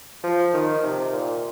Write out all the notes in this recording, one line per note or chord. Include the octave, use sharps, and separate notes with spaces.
F3
D#3
C3
A#2